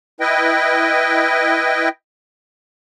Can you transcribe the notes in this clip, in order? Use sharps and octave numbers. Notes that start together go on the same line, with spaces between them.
E4 B4 D#5 G5